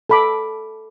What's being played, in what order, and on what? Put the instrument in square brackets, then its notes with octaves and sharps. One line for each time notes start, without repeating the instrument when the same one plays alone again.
[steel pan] A4 B5 D6